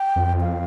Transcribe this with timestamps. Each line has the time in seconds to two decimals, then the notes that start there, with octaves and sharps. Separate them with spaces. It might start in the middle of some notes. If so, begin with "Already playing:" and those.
Already playing: G5
0.16 F2
0.41 F5